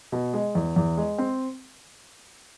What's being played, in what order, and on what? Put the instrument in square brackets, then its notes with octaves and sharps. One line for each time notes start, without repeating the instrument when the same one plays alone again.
[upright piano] B2
G#3
E2
E2
G#3
C4